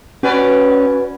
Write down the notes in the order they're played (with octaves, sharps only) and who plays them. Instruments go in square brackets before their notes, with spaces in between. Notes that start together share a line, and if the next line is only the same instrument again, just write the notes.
[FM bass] C#4 [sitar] F#4 B4 D5